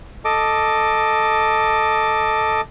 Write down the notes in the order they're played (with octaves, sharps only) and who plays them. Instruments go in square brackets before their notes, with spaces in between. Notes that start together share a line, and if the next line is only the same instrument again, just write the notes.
[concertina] A4 D#5 D6